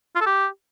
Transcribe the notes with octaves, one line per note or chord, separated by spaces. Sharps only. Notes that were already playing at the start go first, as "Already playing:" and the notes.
F4
A4
G4